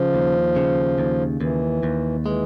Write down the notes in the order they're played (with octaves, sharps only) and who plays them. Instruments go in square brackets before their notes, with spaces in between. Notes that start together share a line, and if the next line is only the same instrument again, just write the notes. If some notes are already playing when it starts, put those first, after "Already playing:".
Already playing: [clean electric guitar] C#3 [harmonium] F3
[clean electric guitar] D#2
C#3
D#2
[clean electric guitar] D#2 [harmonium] E3
[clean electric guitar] D#2
[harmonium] E3 [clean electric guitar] G#3